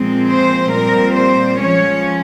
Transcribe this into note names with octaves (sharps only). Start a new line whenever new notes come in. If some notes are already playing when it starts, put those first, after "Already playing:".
Already playing: A#2 F3 G#3 C4
C5
A#2 G3 C4 A#4
C5
F3 G#3 C#4 C#5